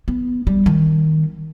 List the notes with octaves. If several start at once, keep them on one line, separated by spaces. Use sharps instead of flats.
B3
G3
D#3